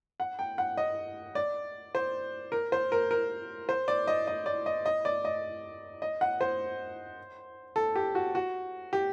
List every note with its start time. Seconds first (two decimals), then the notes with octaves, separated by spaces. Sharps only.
0.20 F#5
0.39 G5
0.58 F#5
0.77 D#5
1.35 D5
1.95 C5
2.52 A#4
2.72 C5
2.92 A#4
3.11 A#4
3.69 C5
3.88 D5
4.07 D#5
4.27 D#5
4.46 D5
4.66 D#5
4.86 D#5
5.05 D5
5.25 D#5
6.02 D#5
6.21 F#5
6.41 C5
7.76 A4
7.96 G4
8.15 F#4
8.35 F#4
8.93 G4